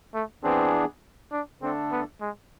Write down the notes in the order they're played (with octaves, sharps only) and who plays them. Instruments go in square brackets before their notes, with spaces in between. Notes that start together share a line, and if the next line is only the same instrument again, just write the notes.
[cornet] A3
[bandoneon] E3 B3 D4 G#4 [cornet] C4
[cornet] D4
[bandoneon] D3 A3 D4 A4 [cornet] C4
[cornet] B3
G#3